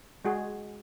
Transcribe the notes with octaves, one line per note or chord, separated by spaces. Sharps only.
G#3 F#4 G#4